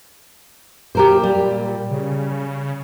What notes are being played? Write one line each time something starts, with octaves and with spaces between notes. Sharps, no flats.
A#2 G4 A#4 C5
G3
C#3